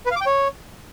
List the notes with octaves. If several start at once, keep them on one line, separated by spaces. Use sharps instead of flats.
B4
F5
D6
G5
C#5